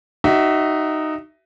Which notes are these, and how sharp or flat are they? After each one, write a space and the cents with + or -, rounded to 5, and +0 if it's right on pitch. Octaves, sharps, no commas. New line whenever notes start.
D#4 -5 F#4 +35 E5 +0